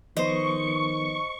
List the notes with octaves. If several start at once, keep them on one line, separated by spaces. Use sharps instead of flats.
D#3 F3 B3 B4 C5 D#5 C#6